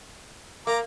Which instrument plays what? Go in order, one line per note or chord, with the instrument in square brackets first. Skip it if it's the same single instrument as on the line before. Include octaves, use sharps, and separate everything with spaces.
[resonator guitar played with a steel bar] A#3 [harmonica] A#5 D6